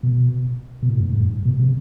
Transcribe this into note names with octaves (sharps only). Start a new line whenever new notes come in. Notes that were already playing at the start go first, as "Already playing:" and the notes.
B2
B2
A2
G2
A2
G2
B2
C3